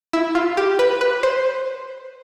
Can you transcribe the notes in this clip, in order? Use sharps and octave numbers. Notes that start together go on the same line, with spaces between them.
E4
F4
G4
B4
B4
C5